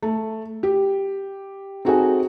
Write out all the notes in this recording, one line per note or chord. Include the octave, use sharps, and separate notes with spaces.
A3
G4
C4 D#4 F#4 G#4 A4 G#5